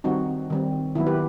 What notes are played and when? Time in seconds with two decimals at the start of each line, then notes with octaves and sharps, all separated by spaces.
0.04 D#3 G3 C4 D#4 F#4
0.50 D#3 G3 C4
0.95 D#3 F#3 B3 E4
1.06 G4 B4